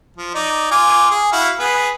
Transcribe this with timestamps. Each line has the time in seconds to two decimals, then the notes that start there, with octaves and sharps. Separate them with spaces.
0.16 F3
0.34 D#4 D5
0.71 F4 G#5 D6
1.10 G#4
1.32 E4 F#4 F5
1.59 B3 G#4 B4